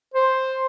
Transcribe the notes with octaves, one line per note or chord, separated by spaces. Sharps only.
C5